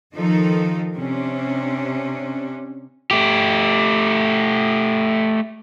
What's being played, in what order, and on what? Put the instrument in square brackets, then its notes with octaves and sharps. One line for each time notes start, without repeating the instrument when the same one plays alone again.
[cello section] D#3 F3 D#4 A4
C3 C#4 D4
[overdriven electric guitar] A3 G4